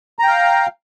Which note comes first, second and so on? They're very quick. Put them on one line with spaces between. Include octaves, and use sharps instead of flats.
A#5 G5 F5